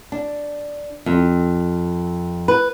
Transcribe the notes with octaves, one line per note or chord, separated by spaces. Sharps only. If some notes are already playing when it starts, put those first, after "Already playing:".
D4
F2
B4